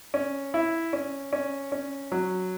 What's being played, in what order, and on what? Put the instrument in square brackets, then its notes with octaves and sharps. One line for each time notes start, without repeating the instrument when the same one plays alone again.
[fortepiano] C#4
E4
C#4
C#4
C#4
F#3